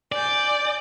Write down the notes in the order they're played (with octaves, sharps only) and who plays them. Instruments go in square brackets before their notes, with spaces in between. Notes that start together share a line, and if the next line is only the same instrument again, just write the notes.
[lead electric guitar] D5 [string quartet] G#5 G6